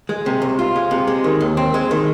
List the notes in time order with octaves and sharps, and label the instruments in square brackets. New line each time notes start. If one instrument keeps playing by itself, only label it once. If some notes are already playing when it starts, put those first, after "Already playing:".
[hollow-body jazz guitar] G#3
C3
C2
F4
G#3
C3
G#3
D#3
D#2
C4
G#3
D#3